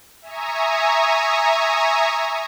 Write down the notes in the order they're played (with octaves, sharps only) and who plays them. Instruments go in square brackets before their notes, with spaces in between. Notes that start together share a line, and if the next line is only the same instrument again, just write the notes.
[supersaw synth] E5 G#5 A#5 C#6 D#6